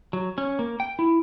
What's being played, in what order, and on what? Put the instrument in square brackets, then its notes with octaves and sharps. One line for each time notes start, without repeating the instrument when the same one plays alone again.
[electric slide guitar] F#3
C#4
A#3
G5
E4